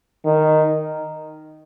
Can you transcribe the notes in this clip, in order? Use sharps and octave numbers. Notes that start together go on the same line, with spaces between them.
D#3